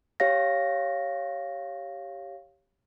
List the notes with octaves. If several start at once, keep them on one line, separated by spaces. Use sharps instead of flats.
G4 C#5 F5 A#6